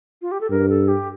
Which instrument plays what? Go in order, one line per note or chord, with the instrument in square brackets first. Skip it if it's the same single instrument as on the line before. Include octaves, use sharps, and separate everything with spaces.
[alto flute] F4
G4
A4
[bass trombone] G2 [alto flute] A#4
[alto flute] A4
G4